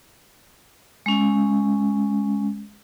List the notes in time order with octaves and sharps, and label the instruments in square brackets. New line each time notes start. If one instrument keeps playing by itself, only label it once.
[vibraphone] G#3 C#4